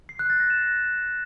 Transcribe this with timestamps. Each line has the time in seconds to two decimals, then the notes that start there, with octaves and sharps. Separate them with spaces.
0.09 C7
0.19 F#6
0.30 A6
0.40 A#6
0.50 E7